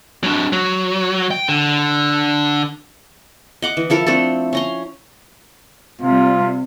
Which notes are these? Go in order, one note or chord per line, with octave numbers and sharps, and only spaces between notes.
F#3 D4
F#3
G5
D3
D#5 F#5 D6
E3
F3 E4 A4 A#4
A3 C4 D4 A4
C#4 A#5 C6
C3 G3 F4